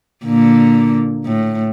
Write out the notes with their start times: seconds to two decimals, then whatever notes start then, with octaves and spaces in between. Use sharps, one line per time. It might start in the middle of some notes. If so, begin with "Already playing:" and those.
0.25 A#2 D3 A#3
1.26 A2